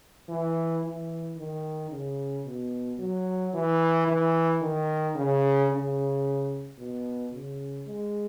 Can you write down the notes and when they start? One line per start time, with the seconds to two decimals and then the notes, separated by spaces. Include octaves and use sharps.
0.29 E3
0.83 E3
1.37 D#3
1.91 C#3
2.45 B2
2.99 F#3
3.54 E3
4.07 E3
4.62 D#3
5.15 C#3
5.70 C#3
6.78 B2
7.33 C#3
7.87 G#3